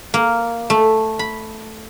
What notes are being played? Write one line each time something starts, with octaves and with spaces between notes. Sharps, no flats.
A#3
A3
B5